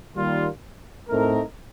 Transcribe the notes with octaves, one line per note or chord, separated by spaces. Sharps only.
D#3 G3 A#3 F4
A2 A3 C4 D#4 A#4